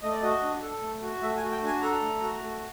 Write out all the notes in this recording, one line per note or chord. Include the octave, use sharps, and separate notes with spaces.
A3 D#5
D5
F#4 D#5
D4
A4
A3
F#4
A3 E5
G#5
F#4
G5
D4 G#5
A4 A#5
A3
F#4
A3